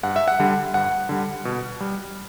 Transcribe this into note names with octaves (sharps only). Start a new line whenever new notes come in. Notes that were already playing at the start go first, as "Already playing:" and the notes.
G2 F#5
E5
F#5
D3 G3
G2 F#5
D3 G3
B2
G3